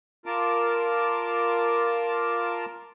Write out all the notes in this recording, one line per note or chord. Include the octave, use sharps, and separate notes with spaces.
F4 A#4 A5 D6